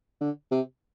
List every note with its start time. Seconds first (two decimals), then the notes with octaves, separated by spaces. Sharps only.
0.21 D3
0.51 C3